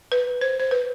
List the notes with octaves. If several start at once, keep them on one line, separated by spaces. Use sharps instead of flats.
B4
C5
C5
B4